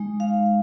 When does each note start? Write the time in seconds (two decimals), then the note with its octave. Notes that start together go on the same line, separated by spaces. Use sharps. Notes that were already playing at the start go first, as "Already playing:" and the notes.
Already playing: G#3 D#4
0.20 F5